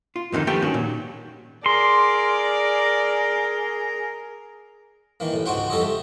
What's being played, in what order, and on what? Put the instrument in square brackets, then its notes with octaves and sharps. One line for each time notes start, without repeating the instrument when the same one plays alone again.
[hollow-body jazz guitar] F4
F2 A2 D3 D#3 D#4
F3 A3 B3 G4 G5
G2 D#3 C#4 F#4
A#2
[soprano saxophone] G#4 [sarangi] A#4 [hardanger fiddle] D5 [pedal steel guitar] C6
[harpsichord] D#3 E3 A#3
A1 A2
C#2 G#2 F#4 C5 F#5 G5
F2 G3 A4 C#5 D#5
A3 G4